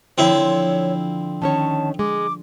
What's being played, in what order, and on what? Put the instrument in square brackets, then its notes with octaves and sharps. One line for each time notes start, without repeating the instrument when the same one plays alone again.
[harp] D3 F3 [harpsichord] C4 E4 [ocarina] C#5
[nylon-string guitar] D#3 C#4 C#5 [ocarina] A5
[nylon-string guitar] G#3 [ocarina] D6